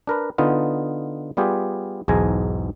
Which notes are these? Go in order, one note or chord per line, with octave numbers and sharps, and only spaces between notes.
D4 A#4 B4
D3 B3 D#4 F4
G3 B3 F4 G4 G#4
B1 E2 G#2 G#3 G#5 A#5